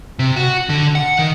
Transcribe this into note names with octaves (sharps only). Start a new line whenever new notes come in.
C3
F#4
D3
F#5
D#3